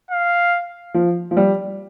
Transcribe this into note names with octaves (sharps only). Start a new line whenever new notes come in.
F5
F3
F3
G3